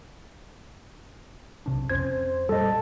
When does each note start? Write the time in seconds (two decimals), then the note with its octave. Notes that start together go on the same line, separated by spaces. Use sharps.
1.66 B1 C3 D4
1.90 F2 C4 C#4 C5 G#6
2.49 A#2 G3 A4 D#5 A5